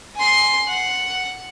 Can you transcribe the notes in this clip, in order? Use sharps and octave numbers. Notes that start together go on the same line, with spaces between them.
G#5 C6
F#5